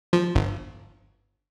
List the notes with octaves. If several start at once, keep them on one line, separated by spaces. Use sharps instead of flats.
F3
G1